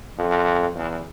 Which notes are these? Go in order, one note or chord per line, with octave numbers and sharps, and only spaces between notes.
F2
E2